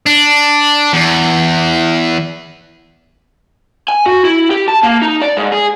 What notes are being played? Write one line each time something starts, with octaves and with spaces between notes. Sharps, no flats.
D4
E2
G#5
F#4
E4
G4
A5
A#3
D#4
D5
G#2
G#4